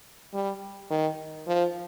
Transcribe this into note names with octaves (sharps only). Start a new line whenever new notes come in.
G3
D#3
F3